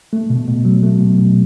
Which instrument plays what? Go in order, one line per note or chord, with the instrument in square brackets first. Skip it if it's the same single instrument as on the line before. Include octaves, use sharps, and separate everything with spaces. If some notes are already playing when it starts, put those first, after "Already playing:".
[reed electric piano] A3
B2
B2
F#3
A3
B2
B2